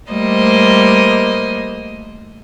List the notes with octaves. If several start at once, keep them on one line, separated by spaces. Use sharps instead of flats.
G3 A3 A#3 C5 D#5